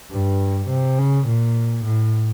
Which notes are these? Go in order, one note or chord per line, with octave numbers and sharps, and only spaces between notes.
G2
C3
C#3
A#2
A2